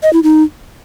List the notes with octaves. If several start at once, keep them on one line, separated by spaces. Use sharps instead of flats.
D#5
E4
D#4